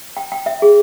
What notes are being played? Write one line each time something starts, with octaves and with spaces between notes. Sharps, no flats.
G5
G5
E5
G#4